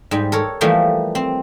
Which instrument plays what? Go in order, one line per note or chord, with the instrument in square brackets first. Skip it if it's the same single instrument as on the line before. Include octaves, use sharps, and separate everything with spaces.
[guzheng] G#2 G3
A4 A#4 C#5
E3 F3 G3 A3 A#3
C4